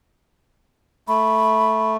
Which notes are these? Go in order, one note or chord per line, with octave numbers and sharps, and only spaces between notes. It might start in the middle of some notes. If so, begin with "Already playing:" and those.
A3 B5